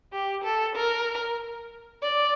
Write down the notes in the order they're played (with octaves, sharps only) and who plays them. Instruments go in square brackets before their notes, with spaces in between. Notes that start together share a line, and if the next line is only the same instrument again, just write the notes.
[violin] G4
A4
A#4
D5